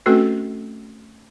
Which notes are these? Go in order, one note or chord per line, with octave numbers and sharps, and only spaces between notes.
A3 C4 C#4 F#4 A4 B4